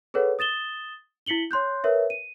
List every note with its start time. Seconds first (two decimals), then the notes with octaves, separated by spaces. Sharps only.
0.14 G#4 A4 B4 C#5 F#5
0.39 D#6 A6 E7 G7
1.26 E4 B6 C#7 F#7 G7
1.51 C#5 C6 F#6 G6
1.84 A#4 B4 C#5 E5
2.10 D#7